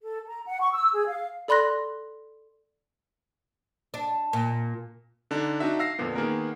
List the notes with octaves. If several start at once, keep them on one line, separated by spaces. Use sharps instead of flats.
A4
A#5
F#5
C#6
E6
G#4
F5
A4 D5 B5 C6 F#6 A#6
D4
A#2
D3 D4 D#4
D4 D#4 F#4 E5
F5 E6 A#6 C7
F2 A#2 D3 B3
D#3 A#3 B3 G#4 A#4